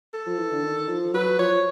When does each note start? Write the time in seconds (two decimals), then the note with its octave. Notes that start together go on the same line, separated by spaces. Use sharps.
0.14 A4
0.27 F3
0.39 E3
0.51 D3
0.64 D#3
0.88 F3
1.14 F#3 B4
1.39 F3 C#5